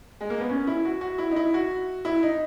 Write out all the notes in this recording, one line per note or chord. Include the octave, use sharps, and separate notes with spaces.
G#3
A#3
B3
C#4
E4
F#4
F#4
E4
D#4
E4
F#4
E4
D#4